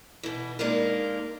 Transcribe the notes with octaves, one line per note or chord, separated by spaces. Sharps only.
B2 E3
G#3 A#3 D4 D#4 A#4